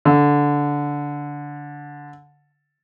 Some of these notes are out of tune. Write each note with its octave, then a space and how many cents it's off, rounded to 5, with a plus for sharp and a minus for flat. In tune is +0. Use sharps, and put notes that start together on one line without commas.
D3 -15